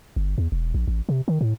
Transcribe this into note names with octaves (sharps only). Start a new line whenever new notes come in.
G1
E2
E1
A#1
A1
C3
D#3
A2